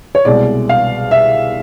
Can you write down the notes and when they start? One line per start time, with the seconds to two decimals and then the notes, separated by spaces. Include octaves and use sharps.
0.15 C#5
0.25 C2 B2 G#3 D5
0.69 F5
1.11 E5